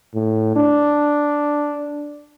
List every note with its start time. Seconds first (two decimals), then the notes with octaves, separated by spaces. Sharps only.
0.14 A2
0.56 D4